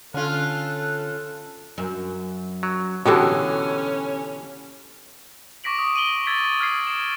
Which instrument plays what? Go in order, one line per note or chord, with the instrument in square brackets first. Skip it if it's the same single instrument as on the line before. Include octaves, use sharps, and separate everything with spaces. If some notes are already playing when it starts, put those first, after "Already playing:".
[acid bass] D3 [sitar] C#4 F4 [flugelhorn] A4 [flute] F#6
[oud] F#2
[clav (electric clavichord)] F#3
[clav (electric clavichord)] B2 D3 E3 [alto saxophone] C#4 [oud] F#4 G4 A4
[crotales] C#6 D6 A#6 B6 D7 F#7
D#6
D7 D#7 F#7 G7
E6 G#6 A6 B6
F6 G#6 B6 C7
D7 E7